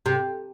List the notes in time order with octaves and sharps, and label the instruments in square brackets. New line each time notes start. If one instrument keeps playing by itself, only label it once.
[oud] C3